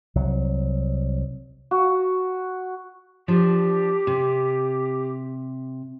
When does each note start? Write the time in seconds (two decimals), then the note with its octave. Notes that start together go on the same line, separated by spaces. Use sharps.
0.15 C2 F#3
1.71 F#4
3.28 F3 D4 G4
4.07 C3